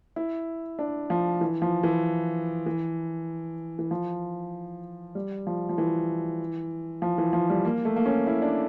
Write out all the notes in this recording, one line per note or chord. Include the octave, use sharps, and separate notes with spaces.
E4
D4
F3
E3
F3
E3
E3
E3
F3
G3
F3
F3
E3
F3
E3
F3
G3
A#3
A3
A#3
C#4
E4
D4